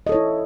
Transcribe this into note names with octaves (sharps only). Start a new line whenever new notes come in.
E4 A4 C#5 D#5